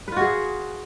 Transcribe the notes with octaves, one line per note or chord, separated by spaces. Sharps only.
F4 F#4 G#4 B4